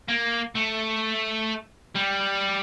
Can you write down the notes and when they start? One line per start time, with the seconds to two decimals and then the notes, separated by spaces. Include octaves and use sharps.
0.08 A#3
0.56 A3
1.96 G3